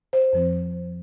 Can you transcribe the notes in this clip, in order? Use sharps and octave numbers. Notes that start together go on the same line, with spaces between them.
C5
F2 F3 C4